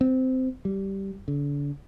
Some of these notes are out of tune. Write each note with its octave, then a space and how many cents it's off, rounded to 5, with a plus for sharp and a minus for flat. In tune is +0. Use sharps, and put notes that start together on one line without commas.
C4 -15
G3 -10
D3 -40